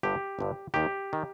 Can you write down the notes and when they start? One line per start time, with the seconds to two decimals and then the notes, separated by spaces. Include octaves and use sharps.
0.03 G1 G2 D3 G4
0.39 G1 G2 D3
0.74 D#2 D#3 G4
1.13 D#3